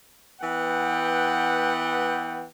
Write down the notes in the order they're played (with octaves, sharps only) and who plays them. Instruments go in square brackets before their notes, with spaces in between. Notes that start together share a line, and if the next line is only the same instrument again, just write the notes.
[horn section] E3 B3 F#5 G5